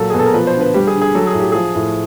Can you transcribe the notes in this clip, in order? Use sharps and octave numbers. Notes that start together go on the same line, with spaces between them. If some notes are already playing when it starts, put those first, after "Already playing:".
Already playing: A#2 F#3 A4
G#4
B2 A4
A#4
F3 B4
C5
D3
B4
G3 G4
G#4
D3
G#4
F#3 A4
G#4
A2
G4
F3 G#4
A2